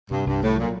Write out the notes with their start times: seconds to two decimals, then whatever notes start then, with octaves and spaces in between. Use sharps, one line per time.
0.11 G2 C3
0.27 C2 G2
0.42 C2 A2
0.57 A#2 F#3